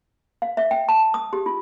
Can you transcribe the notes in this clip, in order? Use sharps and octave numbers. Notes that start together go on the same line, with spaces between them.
F5
E5
G5
A5
D#6
G4
F4